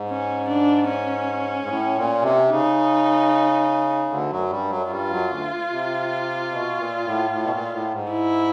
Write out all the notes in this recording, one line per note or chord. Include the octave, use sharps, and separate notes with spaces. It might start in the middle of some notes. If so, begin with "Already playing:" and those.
Already playing: G#2
C#4
D4
C#4
G#2
A2
A#2
C3
C#3 D#4
D2 D3
F#2 F#3
G2 G3
F#2 F#3
G2 G3 F4
F#2 F#3
D2 D3
C3
B2
A#2
A2
A2
B2
A#2
A2
G#2
E4